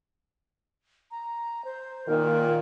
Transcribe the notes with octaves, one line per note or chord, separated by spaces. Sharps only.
A#5
C5
A#2 D#3 A#4